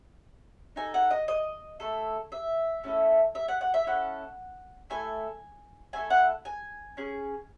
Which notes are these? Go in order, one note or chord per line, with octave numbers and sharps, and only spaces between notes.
D#4 A4 G#5
F#5
D#5
D#5
A3 E4 A4
E5
A3 C#4 E4 A4
E5
F#5
F#5
E5
C#4 E4 A4 F#5
A3 E4 A4 G#5
A3 E4 A4 G#5
F#5
G#5
C#4 G#4